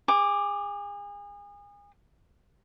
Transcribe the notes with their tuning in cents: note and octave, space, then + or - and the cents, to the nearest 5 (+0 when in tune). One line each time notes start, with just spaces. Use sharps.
G#4 -35 D6 +10